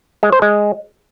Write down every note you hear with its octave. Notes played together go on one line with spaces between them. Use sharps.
G#3
C5
G#3